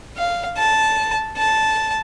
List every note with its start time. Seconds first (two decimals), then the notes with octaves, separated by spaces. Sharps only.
0.17 F5
0.57 A5
1.37 A5